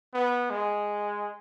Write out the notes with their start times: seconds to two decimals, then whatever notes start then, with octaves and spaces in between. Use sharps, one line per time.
0.14 B3
0.50 G#3